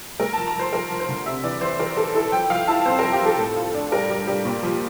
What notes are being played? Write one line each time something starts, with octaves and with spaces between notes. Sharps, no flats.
A3 A#4
F3 A5
A#5
F3 C5
F3 A#4
F3
C5
D3
C3 E5
E3 D5
E3 C5
E3 A#4
E3 A4
E4 A4
F3 G5
F3 F5
E4 A5
C4 C5
F3 A#4
G4
F3 A4
A2
F4
D4
G3 A#4
G3
G3
A#2
F3